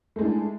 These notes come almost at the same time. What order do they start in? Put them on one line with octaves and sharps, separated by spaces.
A3 G#3 E4 D4